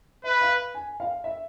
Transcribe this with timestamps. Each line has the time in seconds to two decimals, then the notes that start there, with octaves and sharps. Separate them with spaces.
0.24 B4 E5
0.41 F5
0.74 G#5
1.00 F5
1.24 E5